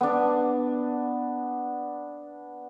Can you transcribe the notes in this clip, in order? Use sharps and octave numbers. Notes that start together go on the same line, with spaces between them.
B3 D4